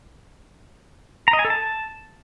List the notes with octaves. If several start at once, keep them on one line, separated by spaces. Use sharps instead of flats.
A#5
D#5
G#5
A4
A5